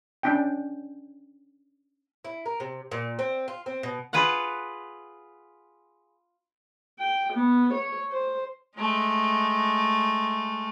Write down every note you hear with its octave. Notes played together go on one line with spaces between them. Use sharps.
C#4 D4 G5
E4
A#4
C3
A#2
C4
F4
C4
B2
F4 G#4 B4 F5 F#5
G5
B3
C#5
C5
G#3 A3